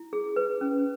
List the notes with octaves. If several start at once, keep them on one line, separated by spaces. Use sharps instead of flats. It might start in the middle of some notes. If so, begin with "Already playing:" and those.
Already playing: E4
G#4
B4
C#4